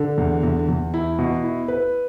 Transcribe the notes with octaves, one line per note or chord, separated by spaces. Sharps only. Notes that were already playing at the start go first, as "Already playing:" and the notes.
Already playing: D3
E2
E2
E2
E4
B2
E4
B4